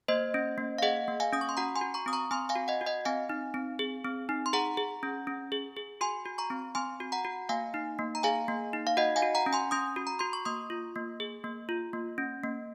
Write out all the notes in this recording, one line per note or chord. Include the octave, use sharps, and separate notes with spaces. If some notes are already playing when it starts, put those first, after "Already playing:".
A#3 C5 D#5
C#4
A#3
F5
G#4 D#5 F#5
A#3
F5 G#5
C#4 D#6
C#6
C6
F#4 F#5 A#5
G#5 C6
F#4
A#5 C#6
C4 D#6
A#5 C#6
C4 G#5 C6
F5 G#5
F#4
D#5 F#5
F#4
D#5 F#5
C4 F5 G#5
D#4
C4
G#4
C4
D#4
C6
G#4 F#5 A#5
G#4
C#4
C#4
G#4
G#4
F#4 G#5 C6
F#4
A#5 C#6
C4
C4 G#5 C6
F#4
F#5 A#5
F#4
A#3 F5 G#5
D#4
A#3
A#5
G#4 F5 G#5
A#3
D#4
F5
F#4 D#5 F#5
F5 G#5
F#4
F#5 A#5
C#4
G#5 C6
C#4 C6 D#6
F#4
A#5
F#4 C6
C#6
A#3 C6 D#6
F4
A#3
G#4
A#3
F4
A#3
C#4
A#3